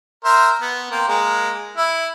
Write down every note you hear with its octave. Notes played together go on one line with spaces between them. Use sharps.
A#4 C5 E5
B3
A#3 C4
G#3 A#3
E4